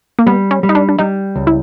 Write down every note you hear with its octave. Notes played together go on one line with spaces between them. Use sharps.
A#3
G3 B3
C#4
G3
D#4
D4
D4
G3 D#4
C#2
E4